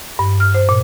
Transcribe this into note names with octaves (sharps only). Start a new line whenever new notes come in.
G2
F6
C5
A#2